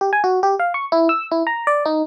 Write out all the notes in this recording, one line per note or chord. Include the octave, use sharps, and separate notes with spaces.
G4
G#5
F#4
G4
F5
C#6
E4
E6
E4
A#5
D5
D#4